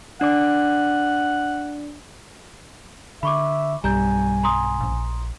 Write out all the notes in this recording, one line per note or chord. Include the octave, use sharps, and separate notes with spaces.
D4 D5 F#5 D6
D3 E5 B5 C#6 D6
B1 G2 G3 G#5 A#5 G6
A#5 C6 D#6
A#1